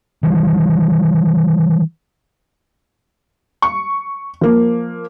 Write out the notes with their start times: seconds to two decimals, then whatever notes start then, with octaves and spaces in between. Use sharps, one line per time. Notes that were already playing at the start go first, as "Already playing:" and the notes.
0.23 D#3 E3 G3
3.62 C#6
4.41 F3 A#3